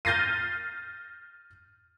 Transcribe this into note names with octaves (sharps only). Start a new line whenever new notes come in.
F6 G6 A6 A#6 C7 D#7